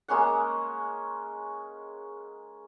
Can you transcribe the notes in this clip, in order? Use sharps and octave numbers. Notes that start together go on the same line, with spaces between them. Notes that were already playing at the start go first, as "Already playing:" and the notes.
G#3 A#3 C#4 F#5